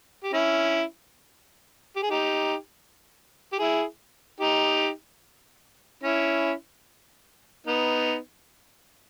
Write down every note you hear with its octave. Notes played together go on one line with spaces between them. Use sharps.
G4
C#4 E4
G4
G#4
D#4 G4
G4
E4 G#4
D#4 G4
C#4 E4
B3 D#4